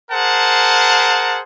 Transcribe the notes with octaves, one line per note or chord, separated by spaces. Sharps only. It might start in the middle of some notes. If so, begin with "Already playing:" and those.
G#4 A#4 C5 F#5 A5